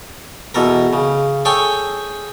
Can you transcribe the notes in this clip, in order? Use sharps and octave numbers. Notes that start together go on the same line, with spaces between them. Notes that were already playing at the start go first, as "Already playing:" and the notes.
E2 B2 A4 A#4
C#3
G#4 A4 C#5 G5 G#5